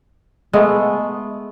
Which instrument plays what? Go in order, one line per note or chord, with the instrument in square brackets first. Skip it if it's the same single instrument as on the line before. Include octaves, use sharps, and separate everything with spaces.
[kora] G#3 A3 B3